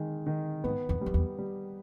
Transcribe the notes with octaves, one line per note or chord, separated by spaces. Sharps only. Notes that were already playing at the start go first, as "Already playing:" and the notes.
Already playing: D#3 G#3
D#3
G#2 B3
E2
G3
F2
E2
G3